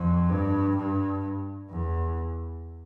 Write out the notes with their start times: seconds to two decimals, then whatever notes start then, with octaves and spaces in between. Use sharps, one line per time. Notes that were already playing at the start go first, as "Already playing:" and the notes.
Already playing: F2
0.30 G2
0.76 G2
1.70 E2